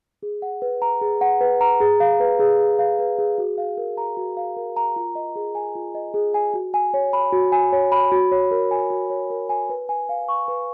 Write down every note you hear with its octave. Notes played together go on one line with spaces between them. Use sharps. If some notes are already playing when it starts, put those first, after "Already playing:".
G#4
F#5
B4
A#5
G#4
F#5
B4
A#5
G#4
F5
B4
G#4
G#4
F5
B4
G#4
F#4
F5
A#4
A#5
F#4
F5
A#4
A#5
F4
D#5
G#4
G#5
F4
D#5
G#4
G#5
F#4
G#5
C#5
B5
F#4
G#5
C#5
B5
F#4
C#5
A#4
G#5
F#4
C#5
A#4
G#5
B4
G#5
F5
C#6
B4